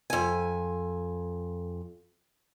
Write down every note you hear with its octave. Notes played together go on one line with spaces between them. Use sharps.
F2 G#5